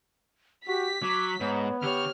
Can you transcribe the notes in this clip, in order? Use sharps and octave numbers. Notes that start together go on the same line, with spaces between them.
F#4 G4 B6
F#3 C#6 D6
G#2 B3 C#5
D3 G4 C#5 F6